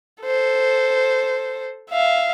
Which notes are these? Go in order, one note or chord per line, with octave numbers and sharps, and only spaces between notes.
A4 C5
E5 F5